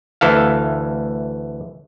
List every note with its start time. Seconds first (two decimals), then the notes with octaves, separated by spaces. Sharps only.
0.21 D2 E3 A4 F5